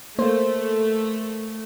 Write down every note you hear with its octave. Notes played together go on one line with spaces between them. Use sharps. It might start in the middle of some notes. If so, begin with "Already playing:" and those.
A3 A#3 C5